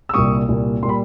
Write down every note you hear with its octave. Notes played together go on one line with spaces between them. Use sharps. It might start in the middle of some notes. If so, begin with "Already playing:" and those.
E6
C2 A#2 G3 C#6 D#6
C2 A#2 G3
A#2 G3 B5 C6